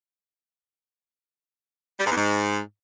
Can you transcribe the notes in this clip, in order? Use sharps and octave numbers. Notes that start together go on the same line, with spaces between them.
G3
G#2
E2
G#2